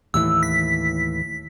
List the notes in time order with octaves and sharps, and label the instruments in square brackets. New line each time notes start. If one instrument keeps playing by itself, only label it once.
[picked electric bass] D#2 A2 E3 [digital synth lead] E6
[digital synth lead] B6